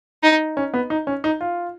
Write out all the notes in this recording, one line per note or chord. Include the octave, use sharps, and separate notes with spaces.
D#4
C#4
B3
D#4
C#4
D#4
F4